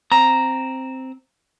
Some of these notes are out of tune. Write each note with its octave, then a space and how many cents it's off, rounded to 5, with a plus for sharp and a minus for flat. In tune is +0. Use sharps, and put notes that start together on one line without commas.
C4 +0 A#5 +0